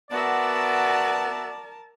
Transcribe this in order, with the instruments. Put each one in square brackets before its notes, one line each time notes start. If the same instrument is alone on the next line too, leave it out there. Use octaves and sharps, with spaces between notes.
[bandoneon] B3 [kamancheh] F#4 E5 [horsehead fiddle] A#4 A5 [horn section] D5